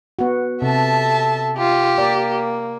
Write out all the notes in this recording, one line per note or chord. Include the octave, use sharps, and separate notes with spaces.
B3 F#4
C3 A4 E5 A5
F4 G4
A#3 D5